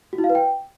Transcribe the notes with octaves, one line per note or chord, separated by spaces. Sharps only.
F#4
E4
F5
B4
G5